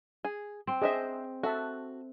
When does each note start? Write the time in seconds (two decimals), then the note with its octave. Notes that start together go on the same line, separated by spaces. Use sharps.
0.25 G#4
0.67 C4
0.82 D4 G#4 C5 D#5 E5
1.43 F#4 A4 E5 A5